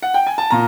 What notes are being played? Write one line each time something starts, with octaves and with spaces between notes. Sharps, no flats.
F#5
G5
G#5
A5
A#2 A#5